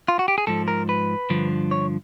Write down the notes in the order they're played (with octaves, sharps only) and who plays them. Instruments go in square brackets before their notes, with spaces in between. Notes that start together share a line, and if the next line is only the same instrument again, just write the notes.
[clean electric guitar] F4
F#4
G4
G#4
G#2 F3 A4
A#4
B4
G2 D3 F3
C#5